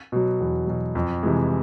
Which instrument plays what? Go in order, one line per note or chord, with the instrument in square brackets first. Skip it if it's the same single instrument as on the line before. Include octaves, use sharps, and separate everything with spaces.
[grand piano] B2 F#3
E2
B2 F#3
F2
C3 E3 G#3